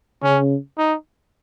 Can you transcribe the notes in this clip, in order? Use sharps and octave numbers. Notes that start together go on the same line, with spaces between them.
C#3 C#4
D#4